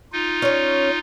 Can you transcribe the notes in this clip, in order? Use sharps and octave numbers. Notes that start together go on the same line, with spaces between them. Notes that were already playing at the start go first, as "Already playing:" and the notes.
D#4 F4
C#4 C#5